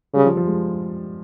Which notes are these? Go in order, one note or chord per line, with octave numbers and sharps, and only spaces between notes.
C#3 G3
F3
F3
G#3